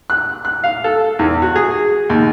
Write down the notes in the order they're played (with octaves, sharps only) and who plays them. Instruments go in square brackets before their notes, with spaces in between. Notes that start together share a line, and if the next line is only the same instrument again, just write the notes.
[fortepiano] F#6
F#6
F5
A4
E2
F#4
G#4
D#2